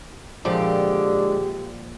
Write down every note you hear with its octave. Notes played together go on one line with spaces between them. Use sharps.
A#2 D3 F3 G#3 G4